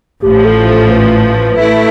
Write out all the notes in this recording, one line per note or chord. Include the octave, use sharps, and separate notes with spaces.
A1 A2 F3 G4
A4
A4
B4
A3 E4